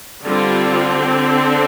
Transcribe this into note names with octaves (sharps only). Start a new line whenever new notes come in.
D3 G3 C4 F4